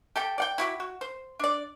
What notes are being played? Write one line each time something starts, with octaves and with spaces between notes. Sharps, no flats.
G4 A4 G5
D5 F#5 G5
E4 F#4 G4
F#4
C5
D4 D5